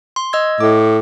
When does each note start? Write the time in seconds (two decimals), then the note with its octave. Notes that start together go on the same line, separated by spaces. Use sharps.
0.16 C6
0.33 D#5 E6 G#6
0.60 A2 D6